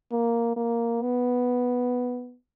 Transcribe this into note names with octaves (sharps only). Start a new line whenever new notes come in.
A#3
A#3
B3